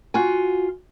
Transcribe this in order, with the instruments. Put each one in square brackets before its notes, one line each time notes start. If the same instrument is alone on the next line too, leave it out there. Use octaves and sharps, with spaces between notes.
[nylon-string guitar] F4 F#4 G#5